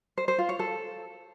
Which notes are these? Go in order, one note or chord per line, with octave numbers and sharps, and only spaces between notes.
C5
C5
F4
C#5
A4